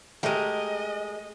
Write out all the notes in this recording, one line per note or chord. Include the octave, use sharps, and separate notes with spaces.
G#3 A3 G4 A#4 D#5